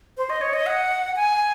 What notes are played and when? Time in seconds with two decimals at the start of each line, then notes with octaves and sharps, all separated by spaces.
0.17 C5
0.30 D#5
0.41 C#5
0.53 D#5
0.66 F#5
1.16 G#5